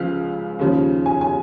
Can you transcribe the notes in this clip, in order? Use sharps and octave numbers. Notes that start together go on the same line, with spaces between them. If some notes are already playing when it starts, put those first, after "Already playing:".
Already playing: C#2 C#3 F3 F5
D#2 C#3 F3
G#5
G#5